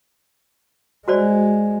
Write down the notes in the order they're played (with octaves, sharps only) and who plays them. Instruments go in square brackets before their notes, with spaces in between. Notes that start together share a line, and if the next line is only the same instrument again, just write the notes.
[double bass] G#3 [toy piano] F#4 C5 D5